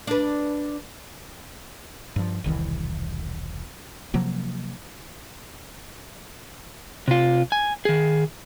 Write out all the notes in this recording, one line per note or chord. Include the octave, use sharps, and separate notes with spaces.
D4 B4
G2 F3
E1 C2 D#3 E3
C3 F3 F#3 A#3
C3 F4
G#5
D#3 G#4